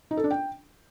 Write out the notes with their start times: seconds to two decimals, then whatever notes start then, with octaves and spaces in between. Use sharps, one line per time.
0.11 D#4
0.17 A4
0.24 D4
0.31 G5